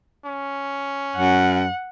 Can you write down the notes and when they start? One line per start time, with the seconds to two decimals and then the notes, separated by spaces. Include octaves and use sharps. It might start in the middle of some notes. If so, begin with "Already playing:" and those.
0.25 C#4
1.16 F#2 F#5